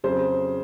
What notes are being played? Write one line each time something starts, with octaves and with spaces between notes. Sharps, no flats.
F2 C#3 F#3 C5